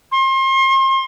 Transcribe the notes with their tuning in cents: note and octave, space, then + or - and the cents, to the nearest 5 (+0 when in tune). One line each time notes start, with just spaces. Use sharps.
C6 +35